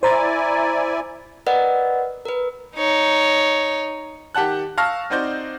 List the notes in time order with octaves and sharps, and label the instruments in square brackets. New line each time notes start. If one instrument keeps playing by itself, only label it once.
[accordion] E4 D5 G#5 [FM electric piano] C5 A#5 A6
[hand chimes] A#4 B4 D5 D#5 F#5
A#4 B4
[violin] D#4 C#5
[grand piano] D#3 G4 F#5 A5 F#6
F5 A5 C#6 E6 F6 A#6
C4 D#4 F#4 C5 D5 G6